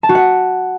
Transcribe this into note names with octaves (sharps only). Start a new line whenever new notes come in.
A5
F#4
F#5